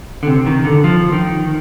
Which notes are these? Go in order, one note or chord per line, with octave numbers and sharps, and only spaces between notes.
D3
C3
D#3
D3
F3
D#3